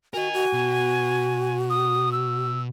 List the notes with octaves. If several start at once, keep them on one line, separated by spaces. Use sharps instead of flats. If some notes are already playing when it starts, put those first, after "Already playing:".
F#4 A#4 D#5 G#5
F#4
B2
D#6
E6